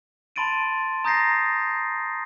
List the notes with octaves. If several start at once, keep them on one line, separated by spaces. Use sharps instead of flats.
A5 B5 C6 A6 D7 D#7
A#5 D#6 G6 A6 A#6 C7